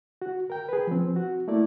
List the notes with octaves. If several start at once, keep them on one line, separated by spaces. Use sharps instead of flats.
F#4
A#4 G5
G#4 B4
F3 C4
F#4
A3 A#3 E4 D5